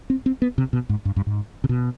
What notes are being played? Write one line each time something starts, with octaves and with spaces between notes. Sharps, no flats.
C4
C4
B3
C3
B2
G#2
G2
G2
G#2
C3
B2